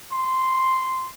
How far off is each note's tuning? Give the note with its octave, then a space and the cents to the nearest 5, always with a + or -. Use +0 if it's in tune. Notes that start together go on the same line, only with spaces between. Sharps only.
C6 -5